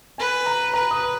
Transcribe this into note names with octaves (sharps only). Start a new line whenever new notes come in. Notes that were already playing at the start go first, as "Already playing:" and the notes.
B4 G#5
A#5
B4 A#5
D#6